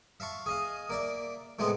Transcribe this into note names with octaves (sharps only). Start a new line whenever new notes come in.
E5 F5 A5 C#6
G#4 D#5 F5
A#3 D5 E5
A2 C3 G#3 B3 C4 F#5